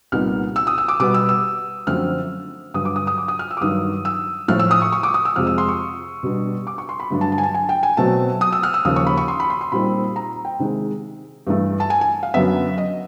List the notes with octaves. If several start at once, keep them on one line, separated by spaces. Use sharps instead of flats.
C2 A#2 G3 B3 D#4 F6
E6
D#6
E6
D6
B2 G3 B3 D6
E6
E6
F#2 D3 F3 A3 C4 F6
G2 D3 F#3 D#6
D6
D#6
D#6
D6
D#6
F6
E6
D6
G2 D#3 F#3 D#6
E6
A2 F3 A3 F6
E6
D#6
C#6
C#6
D6
D#6
E6
F2 C3 F3 G#3 F6
E6
C6
C#6
B2 G3 B3 D4
D6
C#6
C6
B5
G2 D3 F#3 A3 D4
A5
A5
G#5
A5
G#5
G5
G#5
B2 F#3 A3 C4 A5
D#6
E6
F6
E6
D#2 C#3 F3 D#6
C#6
B5
C#6
C6
B5
C6
C6
A#2 G3 C4 D#4 B5
A#5
G5
C3 D#3 G#3
G2 E3 A3
A5
G#5
G#5
F5
F#2 D3 F#3 B3 E5
D#5